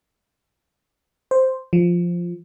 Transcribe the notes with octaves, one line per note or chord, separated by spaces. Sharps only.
C5
F3